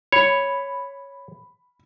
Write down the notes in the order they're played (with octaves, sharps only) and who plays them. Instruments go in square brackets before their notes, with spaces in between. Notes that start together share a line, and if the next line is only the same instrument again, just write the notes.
[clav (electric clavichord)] C#5 [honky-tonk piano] B5